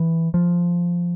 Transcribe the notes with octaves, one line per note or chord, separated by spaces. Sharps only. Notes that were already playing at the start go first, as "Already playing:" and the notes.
Already playing: E3
F3